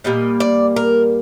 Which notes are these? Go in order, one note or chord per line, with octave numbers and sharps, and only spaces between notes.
A#2 G3 A#3 D#5
D5
A#4